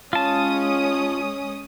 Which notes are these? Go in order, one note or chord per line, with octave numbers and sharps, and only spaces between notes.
G#3 C#4 F4 A5 D#6